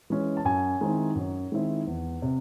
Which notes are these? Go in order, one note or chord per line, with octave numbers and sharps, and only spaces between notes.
E3 G#3 C#4
A5
F#2 G#5
D#3 G#3 C4 E4
F#2
D#3 G#3 C4 E4
E2
C3